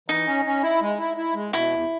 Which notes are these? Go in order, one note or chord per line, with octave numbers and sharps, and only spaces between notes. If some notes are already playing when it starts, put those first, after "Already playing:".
E3 D#4
C#4
C#4
E4
G#3
E4
E4
G#3
B2 E4
E2